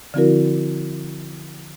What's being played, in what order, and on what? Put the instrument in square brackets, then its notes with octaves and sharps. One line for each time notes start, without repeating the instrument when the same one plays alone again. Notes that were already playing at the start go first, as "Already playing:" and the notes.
[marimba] D3 F3 C4 E4 F#4 A#4